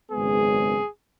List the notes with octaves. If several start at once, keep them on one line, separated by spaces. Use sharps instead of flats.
G#1 F#2 C#3 G#3 B3 G#4